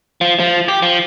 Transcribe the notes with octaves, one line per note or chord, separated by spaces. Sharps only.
F3
F3
G4
F3